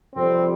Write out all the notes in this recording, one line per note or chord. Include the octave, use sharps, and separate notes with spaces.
F2 C3 G3 C4